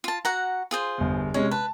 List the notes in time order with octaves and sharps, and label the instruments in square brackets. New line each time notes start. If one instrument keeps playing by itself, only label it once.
[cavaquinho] F4 A5
F#4 F#5 A#5
F4 G#4 C5
[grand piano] G1 E2
[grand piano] C3 G#3 C#4 [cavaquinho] C#5
[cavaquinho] B4 [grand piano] A5